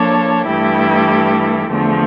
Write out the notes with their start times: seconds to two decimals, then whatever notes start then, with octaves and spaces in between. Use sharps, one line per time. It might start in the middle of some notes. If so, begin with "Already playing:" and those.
Already playing: F3 A#3 D4 A4 C#5
0.46 G2 E3 A3 E4 G4
1.70 E2 D3 F3 A3